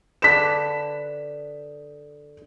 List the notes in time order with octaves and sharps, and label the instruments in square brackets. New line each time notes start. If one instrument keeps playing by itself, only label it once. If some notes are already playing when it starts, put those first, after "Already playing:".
[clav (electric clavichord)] D3 D4 B4 [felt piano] B6 E7